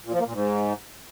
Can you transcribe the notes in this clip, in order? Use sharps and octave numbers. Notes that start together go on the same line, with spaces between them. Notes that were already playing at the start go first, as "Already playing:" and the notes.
A#2
F3
A#3
A#2
G#2